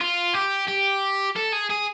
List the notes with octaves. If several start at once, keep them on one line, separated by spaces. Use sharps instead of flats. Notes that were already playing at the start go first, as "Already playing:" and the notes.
F4
G4
G4
A4
G#4
G#4